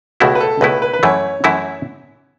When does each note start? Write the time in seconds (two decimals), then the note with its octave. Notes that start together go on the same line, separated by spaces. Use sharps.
0.20 C#2 B2 A3 E4 F#4
0.35 B4
0.40 A4
0.61 C#2 B2 A3 E4 B4
0.82 B4
0.93 B4
1.03 F#2 E3 A3 E4 C#5
1.44 F#2 E3 A3 E4